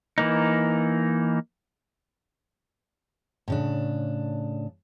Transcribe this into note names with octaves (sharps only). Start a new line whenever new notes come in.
E3 A#3 D#4
A2 C#3 D4